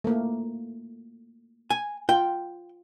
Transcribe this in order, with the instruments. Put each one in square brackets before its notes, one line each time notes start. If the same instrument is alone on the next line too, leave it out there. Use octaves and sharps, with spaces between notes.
[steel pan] A3 A#3
[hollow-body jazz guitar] G#5
[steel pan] F4 [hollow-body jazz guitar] G5